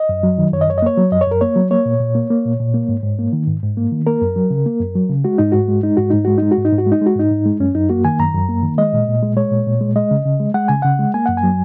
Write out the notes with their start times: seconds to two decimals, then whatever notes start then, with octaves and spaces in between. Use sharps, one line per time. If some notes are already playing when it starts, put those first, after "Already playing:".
Already playing: D#5
0.09 F#2
0.23 F#3
0.38 D#3
0.53 F#2 C#5
0.61 D#5
0.68 F#2 C#5
0.78 D#5
0.82 A#3 C#5
0.97 F#3
1.12 F#2 D#5
1.21 C#5
1.27 F#2 A#4
1.41 A#3 C#5
1.56 F#3
1.71 A#3 C#5
1.86 A#2
2.00 A#2
2.15 A#3
2.30 A#3
2.45 A#2
2.60 A#2
2.74 A#3
2.89 G#2
3.03 G#2
3.19 A#3
3.33 D#3
3.47 G#2
3.63 G#2
3.77 A#3
3.92 D#3
4.07 A#3 A#4
4.22 F#2
4.36 F#3
4.50 C#3
4.66 A#3
4.80 F#2
4.96 F#3
5.10 C#3
5.24 G#3 F#4
5.38 G#2 D#4
5.52 G#2 F#4
5.68 G#3
5.83 G#3 D#4
5.97 G#2 F#4
6.10 G#2 D#4
6.25 G#3 F#4
6.38 G#3 D#4
6.51 F#4
6.57 G#2
6.65 D#4
6.72 G#2
6.78 F#4
6.86 G#3
6.92 D#4
7.01 G#3 F#4
7.16 G#2 D#4
7.31 G#2
7.45 G#3
7.60 F#2 C#4
7.75 F#2 D#4
7.89 A#3 F#4
8.05 D#3 G#5
8.19 F#2 A#5
8.34 F#2
8.49 A#3
8.63 D#3
8.78 G#3 D#5
8.93 A#2
9.08 A#2
9.22 G#3
9.37 G#3 C#5
9.52 A#2
9.66 A#2
9.81 G#3
9.96 G#3 D#5
10.11 C#3
10.25 C#3
10.40 G#3
10.54 G#3 F#5
10.68 C#3 G#5
10.82 C#3 F#5
10.99 G#3
11.14 A#3 G#5
11.26 F#2 F#5
11.37 G#5
11.43 F#3